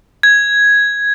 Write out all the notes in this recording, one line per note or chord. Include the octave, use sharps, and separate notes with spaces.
G#6